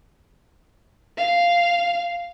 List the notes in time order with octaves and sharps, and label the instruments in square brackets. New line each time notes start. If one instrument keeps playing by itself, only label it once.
[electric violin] F5